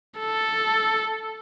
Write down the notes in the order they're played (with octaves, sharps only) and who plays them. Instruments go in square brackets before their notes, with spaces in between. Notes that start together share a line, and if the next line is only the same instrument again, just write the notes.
[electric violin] A4